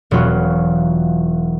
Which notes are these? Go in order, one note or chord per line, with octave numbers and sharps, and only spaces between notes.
E1 F#3 B3 F4 F#4